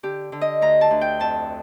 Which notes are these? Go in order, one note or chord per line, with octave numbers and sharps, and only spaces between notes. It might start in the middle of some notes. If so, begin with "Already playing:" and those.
D3 G4
D3
D#5
D2 A#5
A5
D2
G5
F2 A5